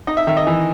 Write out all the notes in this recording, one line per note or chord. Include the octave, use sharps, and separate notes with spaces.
D#4 D#5
E5
D#3 E5
D#5
E3